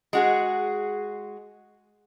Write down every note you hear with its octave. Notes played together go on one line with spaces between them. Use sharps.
G#3 F#4 G#4